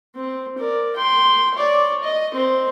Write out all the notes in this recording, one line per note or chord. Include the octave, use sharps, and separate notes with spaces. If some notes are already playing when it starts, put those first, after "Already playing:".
C4
A#4 D5
G5 C6
C#5 D5
D#5
C4 C5